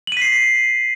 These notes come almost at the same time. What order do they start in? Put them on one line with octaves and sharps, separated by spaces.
F#7 D#7 B6 C7